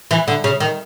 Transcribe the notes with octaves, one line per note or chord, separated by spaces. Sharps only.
E3
D3
C#3
D#3